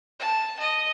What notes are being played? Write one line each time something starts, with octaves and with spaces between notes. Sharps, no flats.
A5
D#5